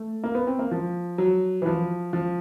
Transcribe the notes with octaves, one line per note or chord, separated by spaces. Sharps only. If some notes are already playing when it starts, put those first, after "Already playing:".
Already playing: A3
A#3
B3
C4
A#3
F3
F#3
E3
F3
F3